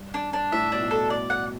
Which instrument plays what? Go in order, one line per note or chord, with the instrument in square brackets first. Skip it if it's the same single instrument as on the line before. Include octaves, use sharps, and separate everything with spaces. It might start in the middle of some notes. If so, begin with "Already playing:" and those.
Already playing: [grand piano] G2
[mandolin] D4
D4
[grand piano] A2 [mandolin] E5
[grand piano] B2 [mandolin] D4
[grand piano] A2
[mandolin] A4
D5
F#5